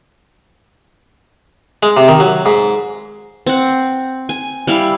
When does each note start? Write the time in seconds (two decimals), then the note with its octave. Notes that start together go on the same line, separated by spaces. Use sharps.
1.83 G#3
1.97 C3
2.08 D#3
2.20 F#3
2.46 G#2
3.46 C4 F#5
4.29 G#5
4.67 G3 E4 F5